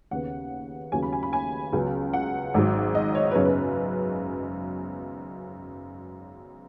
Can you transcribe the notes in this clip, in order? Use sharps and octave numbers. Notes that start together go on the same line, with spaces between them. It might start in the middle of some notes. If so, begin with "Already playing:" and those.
D#2 C#3 B3 F#5
D#2 C#3 F#3 B3 G#5
B5
G#5
B5
G#5
C#2 C#3 F#3 B3
F#5
G#1 G#2 F#3
D#5
C#5
B4
F#2 C#3 B3 C#5
B4